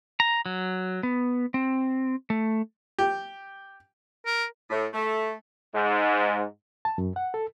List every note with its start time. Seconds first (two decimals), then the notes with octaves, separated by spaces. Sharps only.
0.20 A#5
0.46 F#3
1.03 B3
1.54 C4
2.30 A3
2.99 G4
4.26 A#4
4.70 A2
4.92 A3
5.75 G#2
6.85 A5
6.98 F#2
7.16 F#5
7.34 A4